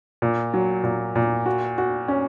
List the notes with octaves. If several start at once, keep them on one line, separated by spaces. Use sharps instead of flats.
A#2
F#3
A#2
A#2
F#4
F#4
C#4